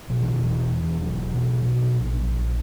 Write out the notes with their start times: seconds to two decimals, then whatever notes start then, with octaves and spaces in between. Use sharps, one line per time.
0.10 B2 F#3
0.21 E3
0.33 D#3
0.41 E1 E3
0.72 E2
1.02 E1 F#3
1.34 B2
1.64 B2
1.95 A#1
2.26 A#1